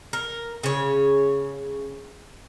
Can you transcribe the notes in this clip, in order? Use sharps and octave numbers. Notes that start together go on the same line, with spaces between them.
A#4
C#3 C#5